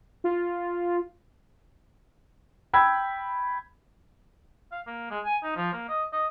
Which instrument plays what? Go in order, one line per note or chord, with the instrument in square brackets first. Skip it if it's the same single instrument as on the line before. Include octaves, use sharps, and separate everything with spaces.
[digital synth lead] F4
[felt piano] G5 B5 E6 G#6
[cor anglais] F5
A#3
G#3
G#5
D#4
F3
A#3
D#5
D#5